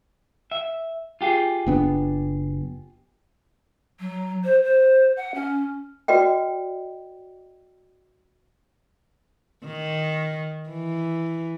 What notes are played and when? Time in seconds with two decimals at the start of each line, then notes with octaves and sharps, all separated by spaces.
0.52 E5
1.21 F4 G4 G#4
1.67 F#1 B3 D4
4.00 F#3
4.44 C5
4.63 C5
5.17 F#5
5.35 C#4
6.08 F#4 B4 D5 D#5 G5
9.66 D#3
10.69 E3